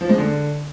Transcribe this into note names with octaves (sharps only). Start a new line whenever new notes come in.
F3
G#3
D3